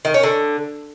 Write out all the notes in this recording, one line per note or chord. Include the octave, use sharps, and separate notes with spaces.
D#3
C#4
D3